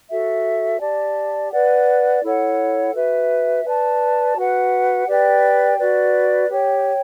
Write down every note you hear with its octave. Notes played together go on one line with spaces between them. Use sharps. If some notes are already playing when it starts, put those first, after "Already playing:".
F#4 A4 E5
G4 D5 A5
B4 D5 F#5
E4 A4 C#5 F#5
F#4 B4 E5
B4 D5 A5
F#4 B4 F#5
G4 B4 D5 G5
F#4 B4 D5
G4 C#5 G5